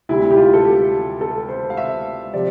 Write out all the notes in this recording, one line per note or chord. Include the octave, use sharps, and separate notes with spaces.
D2 C3 G3 E4
G4
F4
A4
G4
A4
C5
F5
E5
C3 F3 D5